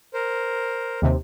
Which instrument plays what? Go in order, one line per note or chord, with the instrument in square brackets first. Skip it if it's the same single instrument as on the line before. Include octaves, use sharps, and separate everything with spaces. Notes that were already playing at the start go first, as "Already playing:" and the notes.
[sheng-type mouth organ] A#4 C5
[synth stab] D#2 C3